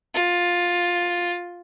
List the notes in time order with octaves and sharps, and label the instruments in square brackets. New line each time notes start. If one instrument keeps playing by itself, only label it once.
[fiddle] F4